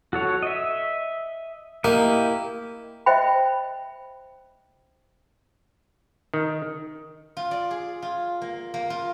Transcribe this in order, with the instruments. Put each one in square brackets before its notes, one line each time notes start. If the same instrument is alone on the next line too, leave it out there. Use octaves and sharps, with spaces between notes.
[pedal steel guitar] F#4 A4 C#5
D#5 E5
[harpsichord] A#3 [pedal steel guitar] E4 G4 D#5
[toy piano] C5 D#5 E5 G5 B5
[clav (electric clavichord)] D#3
[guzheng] F4
D5
G#4
F4
A#3
A#3
F4